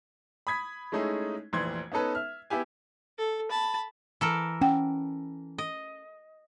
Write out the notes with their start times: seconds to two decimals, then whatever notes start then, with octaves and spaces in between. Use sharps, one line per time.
0.47 B5 D#6 G#6 B6
0.92 G#3 A3 C#4 D#4 E4 G#4
1.53 F1 A#1 E3 C6 G#6
1.92 B3 C#4 D#4 A4 B4
2.15 E5 F6
2.50 B3 E4 G4 G#5
3.18 A4
3.50 A5 B5
4.21 E3 A4 A#4
4.61 C#4 F#5 G5
5.58 D#5